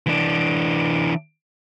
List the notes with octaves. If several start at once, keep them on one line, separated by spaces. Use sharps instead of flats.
E3 D4